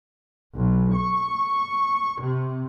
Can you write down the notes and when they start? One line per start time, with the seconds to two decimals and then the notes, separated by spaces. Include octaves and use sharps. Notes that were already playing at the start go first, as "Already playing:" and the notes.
0.55 B1
0.94 C#6
2.20 C3